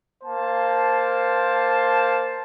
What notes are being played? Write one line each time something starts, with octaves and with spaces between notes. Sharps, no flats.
A#3 C5 A5